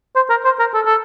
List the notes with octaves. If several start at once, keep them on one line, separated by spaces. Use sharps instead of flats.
C5
A#4
C5
A#4
A4
A4